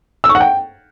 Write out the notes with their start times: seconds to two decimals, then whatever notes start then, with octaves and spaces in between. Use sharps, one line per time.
0.24 E6
0.29 C#6
0.35 F#5
0.40 G5